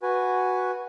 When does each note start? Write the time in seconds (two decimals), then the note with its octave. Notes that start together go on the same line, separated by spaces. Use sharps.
0.02 F#4 B4 G#5